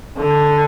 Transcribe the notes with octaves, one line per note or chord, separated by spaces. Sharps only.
D3